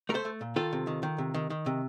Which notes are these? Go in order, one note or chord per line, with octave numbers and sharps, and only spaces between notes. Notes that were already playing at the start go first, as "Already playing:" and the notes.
A3 A4 A#4 C5
A3
A#2
D#3 F4 A4
C3
D#3
D#3
C3
D#3
D#3
C3